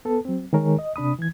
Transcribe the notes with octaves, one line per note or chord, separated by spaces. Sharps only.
B3 A4
F#3 C4
D#3 G#3 G#4 A#4 C#5
D#5
C3 D4 B5 D#6
E3 G#6